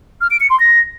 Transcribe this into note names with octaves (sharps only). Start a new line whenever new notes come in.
F6
D7
C#7
C6
A#6